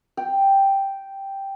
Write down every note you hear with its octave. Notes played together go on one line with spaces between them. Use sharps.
G5